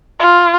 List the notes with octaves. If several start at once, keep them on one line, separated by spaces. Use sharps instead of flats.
F4